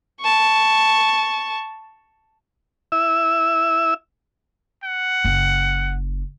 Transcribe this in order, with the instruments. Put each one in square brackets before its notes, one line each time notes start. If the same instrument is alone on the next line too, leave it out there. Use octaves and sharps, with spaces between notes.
[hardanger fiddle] A5 C#6
[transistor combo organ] E4 E5 E6
[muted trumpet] F#5
[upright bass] F#1